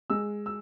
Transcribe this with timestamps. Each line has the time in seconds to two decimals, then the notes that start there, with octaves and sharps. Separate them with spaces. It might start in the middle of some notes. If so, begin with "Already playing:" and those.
0.10 G#3 E6
0.46 E6